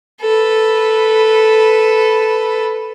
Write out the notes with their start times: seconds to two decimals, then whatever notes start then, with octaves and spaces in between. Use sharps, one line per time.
0.21 A4 B4